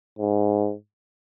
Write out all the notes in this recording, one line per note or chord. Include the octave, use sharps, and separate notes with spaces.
G#2